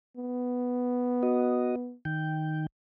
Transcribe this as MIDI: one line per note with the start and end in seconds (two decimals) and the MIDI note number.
0.17 1.95 59
1.23 1.75 66
1.23 1.75 75
2.05 2.66 51
2.05 2.66 79